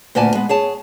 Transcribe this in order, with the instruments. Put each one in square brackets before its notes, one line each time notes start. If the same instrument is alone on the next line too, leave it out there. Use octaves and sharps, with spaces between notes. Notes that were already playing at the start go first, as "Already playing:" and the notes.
[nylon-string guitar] D2 A#2 B3 D5 G#5 A5
G#3 B3
G#4 C#5 A5